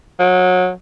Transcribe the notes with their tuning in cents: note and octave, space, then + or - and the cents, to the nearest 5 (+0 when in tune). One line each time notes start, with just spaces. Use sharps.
F#3 -25